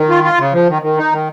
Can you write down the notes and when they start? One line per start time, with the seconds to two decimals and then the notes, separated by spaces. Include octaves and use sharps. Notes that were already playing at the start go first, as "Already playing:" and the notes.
Already playing: D#3
0.09 F4
0.24 F4
0.38 C#3
0.53 F3
0.69 D#3
0.82 D#3
0.97 D#4
1.12 D#3